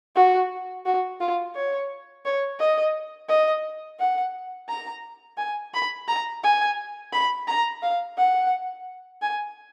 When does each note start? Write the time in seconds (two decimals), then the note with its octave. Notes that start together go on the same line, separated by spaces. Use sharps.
0.16 F#4
0.86 F#4
1.20 F4
1.55 C#5
2.25 C#5
2.60 D#5
3.29 D#5
3.99 F#5
4.69 A#5
5.38 G#5
5.74 B5
6.08 A#5
6.43 G#5
7.13 B5
7.47 A#5
7.82 F5
8.18 F#5
9.22 G#5